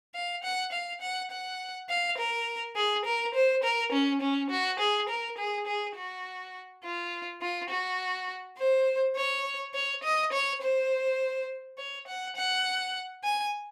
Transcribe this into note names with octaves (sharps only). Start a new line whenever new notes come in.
F5
F#5
F5
F#5
F#5
F5
A#4
G#4
A#4
C5
A#4
C#4
C#4
F#4
G#4
A#4
G#4
G#4
F#4
F4
F4
F#4
C5
C#5
C#5
D#5
C#5
C5
C#5
F#5
F#5
G#5